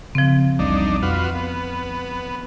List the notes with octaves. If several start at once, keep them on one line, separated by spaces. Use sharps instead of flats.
C#3 F3 C4
B1 E2 G3 D4 D#4
F2 F4 F#4 B4
B3